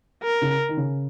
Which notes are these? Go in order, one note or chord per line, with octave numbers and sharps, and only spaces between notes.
A#4
C#3
D#3
C#3